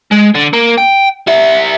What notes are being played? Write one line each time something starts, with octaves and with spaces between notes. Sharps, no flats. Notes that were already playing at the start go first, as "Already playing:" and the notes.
G#3
D3
A#3
G5
G3 E5